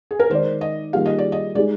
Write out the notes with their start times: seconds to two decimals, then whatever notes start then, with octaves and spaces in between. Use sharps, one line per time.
0.11 G#4
0.19 A#4
0.30 D#3 G#3 D#4 A#4 C5 D5
0.61 D#5
0.93 D#3 G3 A#3 F4 G#4 F5
1.06 D#5
1.19 D5
1.32 D#5
1.55 G#3 D#4 G#4 D5